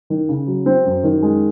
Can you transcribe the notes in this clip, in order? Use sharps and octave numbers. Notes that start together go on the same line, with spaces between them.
D#3
C#3
F#3
C4
F#2
D#3
G#3